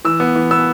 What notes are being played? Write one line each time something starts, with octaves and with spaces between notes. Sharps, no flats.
E3 E6
B3
E3
B3 E6